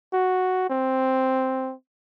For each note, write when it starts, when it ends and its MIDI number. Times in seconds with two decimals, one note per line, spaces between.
0.13 0.69 66
0.70 1.74 60